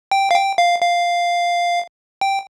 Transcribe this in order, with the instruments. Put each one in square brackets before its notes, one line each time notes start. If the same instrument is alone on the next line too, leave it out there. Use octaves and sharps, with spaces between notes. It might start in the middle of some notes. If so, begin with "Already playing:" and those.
[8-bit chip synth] G5
F5
G5
F5
F5
G5